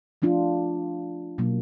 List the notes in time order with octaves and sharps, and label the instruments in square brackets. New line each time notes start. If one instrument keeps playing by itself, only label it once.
[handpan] F3 A3 D4 F4
B2 F#3 A#3